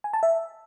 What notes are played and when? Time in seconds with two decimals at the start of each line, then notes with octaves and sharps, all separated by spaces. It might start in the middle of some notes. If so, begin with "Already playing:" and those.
0.04 G#5
0.13 A5
0.23 E5